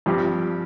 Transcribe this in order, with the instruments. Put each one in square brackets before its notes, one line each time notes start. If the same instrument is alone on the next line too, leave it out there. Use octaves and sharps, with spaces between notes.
[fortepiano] G2 F3 C4 G4